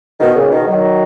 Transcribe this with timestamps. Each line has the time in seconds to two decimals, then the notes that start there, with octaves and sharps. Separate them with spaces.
0.20 B2 D#3
0.35 A#2 C#3
0.50 B2 D#3
0.66 D#3 F#3